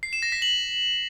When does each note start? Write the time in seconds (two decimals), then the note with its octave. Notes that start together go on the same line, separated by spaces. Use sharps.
0.03 C7
0.13 E7
0.22 A#6
0.32 B6
0.42 F#7